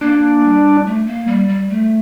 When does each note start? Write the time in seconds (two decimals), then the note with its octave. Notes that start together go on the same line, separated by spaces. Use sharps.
0.01 A#3 D4
0.44 G3
0.85 A3
1.07 A#3
1.27 G3
1.49 G3
1.70 A3